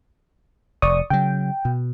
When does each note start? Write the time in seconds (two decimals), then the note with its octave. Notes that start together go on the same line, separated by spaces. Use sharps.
0.82 F1 D5 C#6 D#6
1.10 C#3 F#3 G5
1.65 B2